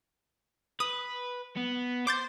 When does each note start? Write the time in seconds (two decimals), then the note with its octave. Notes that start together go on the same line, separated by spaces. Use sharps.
0.80 B4 D#6
1.57 B3
2.07 C5 D6 G6 A6